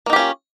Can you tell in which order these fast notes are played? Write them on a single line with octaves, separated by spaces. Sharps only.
A#3 D#4 G4 C#4 F4